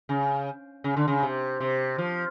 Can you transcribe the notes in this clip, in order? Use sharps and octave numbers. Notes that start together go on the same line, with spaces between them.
C#3
C#3
D3
C#3
C3
C3
F3